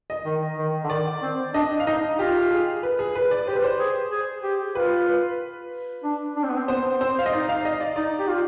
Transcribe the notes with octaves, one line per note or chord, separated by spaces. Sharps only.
D#5
D#3
D#3
D3
D#3 D5
C4
D4 D#5
F5
D#4 D#5
F4 G4
G#4
B4
G#4
B4
D5
G4 C5
B4
C5
G#4
G#4
G4
F4 B4
B4
D4
D4
C4
B3
C4
B3 C5
C4 C5
F5
D#5
D#4 D5
F5
D#5
D5
D#4 D5
G4
F4